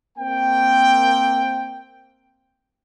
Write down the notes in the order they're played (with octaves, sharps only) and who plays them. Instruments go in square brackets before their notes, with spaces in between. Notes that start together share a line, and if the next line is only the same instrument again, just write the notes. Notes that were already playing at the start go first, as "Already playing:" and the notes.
[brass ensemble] A#3 C4 G5